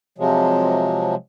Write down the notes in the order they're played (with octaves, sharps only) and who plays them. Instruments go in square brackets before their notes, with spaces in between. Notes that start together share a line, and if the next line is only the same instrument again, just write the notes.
[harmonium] C3 F3 F#3 G#3